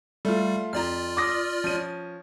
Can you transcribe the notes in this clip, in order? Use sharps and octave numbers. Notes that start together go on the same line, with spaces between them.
G3 A3 F4
F2 F4 D5 A#5 F6
D6 D#6 A#6
F3 C#4 D#7